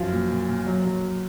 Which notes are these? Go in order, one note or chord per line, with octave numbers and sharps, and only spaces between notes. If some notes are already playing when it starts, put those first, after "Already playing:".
Already playing: F#2 F3
A#2
A#2
A#2
F#3
F#3